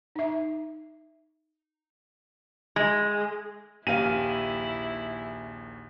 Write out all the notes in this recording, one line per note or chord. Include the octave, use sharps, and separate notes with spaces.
D#4 E5
G#3
A#1 D#2 E4 G4 F5 G#5 D#7